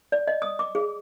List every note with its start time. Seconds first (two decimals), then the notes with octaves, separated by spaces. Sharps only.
0.12 D5
0.27 D#5
0.42 D#6
0.59 D6
0.75 G#4